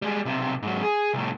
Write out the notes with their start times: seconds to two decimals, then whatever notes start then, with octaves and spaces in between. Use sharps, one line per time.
0.02 G3 G#3
0.25 B1 C3
0.62 G#2 F#3
0.83 G#4
1.14 C2 A2